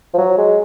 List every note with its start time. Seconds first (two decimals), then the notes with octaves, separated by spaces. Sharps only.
0.14 F3
0.18 F#3
0.38 G#3